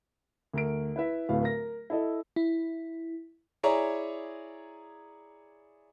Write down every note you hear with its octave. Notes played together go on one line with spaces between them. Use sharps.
D2 A#4 D7
E4 B4 E5
D1 A2 A3 B4 F5
A#4 A#6
E4 A4 D#5
E4
E4 G#4 C#5 D5 A#5